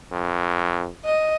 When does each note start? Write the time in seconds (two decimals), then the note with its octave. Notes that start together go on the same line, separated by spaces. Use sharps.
0.11 F2
1.05 D#5